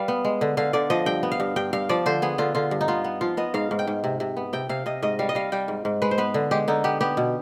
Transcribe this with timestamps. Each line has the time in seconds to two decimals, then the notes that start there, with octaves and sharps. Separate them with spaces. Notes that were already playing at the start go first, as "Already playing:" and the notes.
Already playing: G3 B4 F5
0.08 B3
0.25 G#3
0.41 D3
0.57 D3 F5
0.73 D3 D5
0.90 F3 D#5
1.06 G2 G5
1.23 B3
1.32 F5
1.40 G2
1.56 G2 G5
1.73 G2 F5
1.89 F3 D5
2.06 D3 C5
2.22 B3 G#4
2.38 D3 F4
2.55 D3 F4
2.71 G2
2.81 D#4
2.88 B3 F4
3.04 B3
3.21 F3 F4
3.37 B3 D#5
3.54 G#2 F5
3.71 G#2
3.79 G5
3.87 G#2
4.04 C3
4.20 C3
4.37 B3
4.53 C3 G5
4.69 C3 F5
4.86 C3 D#5
5.02 G#2 D#5
5.19 G3 F5
5.29 D#5
5.35 G3 F5
5.52 G3 G5
5.68 G#2
5.85 G#2
6.02 G#3 B4
6.11 C5
6.18 B3 B4
6.34 D3
6.51 G#3 G4
6.68 D3 D#4
6.84 B3 G4
7.01 B3 G4
7.17 B2